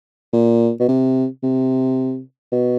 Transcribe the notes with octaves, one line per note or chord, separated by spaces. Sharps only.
A#2
B2
C3
C3
B2